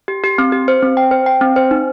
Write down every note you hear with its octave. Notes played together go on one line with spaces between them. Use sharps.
G4
G4
C4
G4
C5
C4
G5
C5
G5
C4
C5
D#4